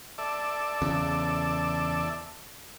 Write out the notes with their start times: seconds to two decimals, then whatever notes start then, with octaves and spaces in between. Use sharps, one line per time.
0.18 A4 D5 E5
0.82 E2 C#3